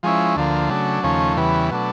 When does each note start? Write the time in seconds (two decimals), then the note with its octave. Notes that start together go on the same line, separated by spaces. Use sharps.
0.03 F3 G#3 C#4 E4
0.36 D2 D3 F3 A#3
0.70 C#3 F#3 A3 D4
1.03 D#2 C#3 F3 A3 C#4
1.37 E2 C#3 E3 G3 B3
1.70 B2 F#3 A3 D4